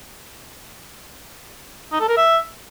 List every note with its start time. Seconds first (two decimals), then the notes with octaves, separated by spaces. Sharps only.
1.92 D#4
2.00 A4
2.09 A#4
2.17 E5